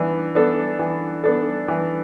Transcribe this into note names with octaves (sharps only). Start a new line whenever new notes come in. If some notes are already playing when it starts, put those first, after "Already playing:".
Already playing: E3 B3 D4
B3 D4 A4
E3
B3 D4 A4
E3